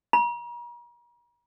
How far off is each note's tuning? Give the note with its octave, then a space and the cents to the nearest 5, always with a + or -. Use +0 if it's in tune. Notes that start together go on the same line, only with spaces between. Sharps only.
A#5 +40